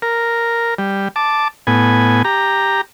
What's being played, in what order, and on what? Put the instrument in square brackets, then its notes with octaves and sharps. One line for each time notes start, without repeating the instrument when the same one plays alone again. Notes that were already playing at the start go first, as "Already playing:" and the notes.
[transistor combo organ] A#4
G3
A5 D6
A2 B3 G#5
G4 A#5